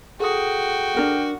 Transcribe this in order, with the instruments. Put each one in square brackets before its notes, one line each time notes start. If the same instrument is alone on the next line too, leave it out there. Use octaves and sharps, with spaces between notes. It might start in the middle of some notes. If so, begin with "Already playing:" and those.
[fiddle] F#4 [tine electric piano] G#4 A4 D#6 [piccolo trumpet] G5
[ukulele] D4 A#4 F#5